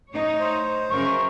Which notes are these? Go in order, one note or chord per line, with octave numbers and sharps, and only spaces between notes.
A2 D#4 C#5
C5
F#2 C#3 A#4 C#6